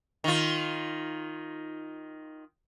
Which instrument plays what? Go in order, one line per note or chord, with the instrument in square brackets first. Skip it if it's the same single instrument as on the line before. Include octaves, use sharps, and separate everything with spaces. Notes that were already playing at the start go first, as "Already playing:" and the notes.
[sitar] D#3 F4